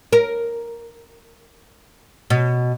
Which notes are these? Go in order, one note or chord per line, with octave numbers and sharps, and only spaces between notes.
A#4
B2